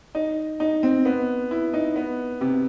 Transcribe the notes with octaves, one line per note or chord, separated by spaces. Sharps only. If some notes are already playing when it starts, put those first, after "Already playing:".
D#4
D#4
C4
B3
E4
D#4
B3
C3